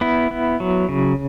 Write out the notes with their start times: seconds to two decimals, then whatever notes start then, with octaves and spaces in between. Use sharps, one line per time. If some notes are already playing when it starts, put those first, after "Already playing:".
0.01 B3 E4
0.31 B3
0.60 F#3
0.89 C#3